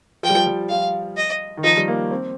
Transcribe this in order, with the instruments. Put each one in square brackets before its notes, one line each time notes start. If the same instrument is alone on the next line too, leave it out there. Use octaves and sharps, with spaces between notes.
[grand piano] F3 [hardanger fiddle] G5
[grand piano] G3
F3
G3
[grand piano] F3 [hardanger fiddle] F5
[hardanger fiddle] D#5
[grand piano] D#3
[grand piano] F3 [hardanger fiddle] D#4
[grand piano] G3
A#3
C4